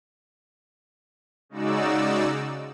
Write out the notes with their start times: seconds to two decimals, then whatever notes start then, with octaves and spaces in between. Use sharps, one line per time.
1.49 C#3 G#3 D#4 F#4 D5 E6